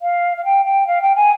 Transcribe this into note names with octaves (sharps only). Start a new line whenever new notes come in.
F5
F5
G5
G5
F5
G5
G#5